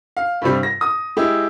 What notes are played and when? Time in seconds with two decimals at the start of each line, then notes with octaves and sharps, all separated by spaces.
0.17 F5
0.42 G2 C3 G3
0.63 A#6
0.81 D#6
1.17 G#3 E4 G4